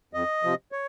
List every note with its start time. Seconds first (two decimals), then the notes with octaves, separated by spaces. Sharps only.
0.13 F2 D#5
0.43 C3 F3
0.72 C#5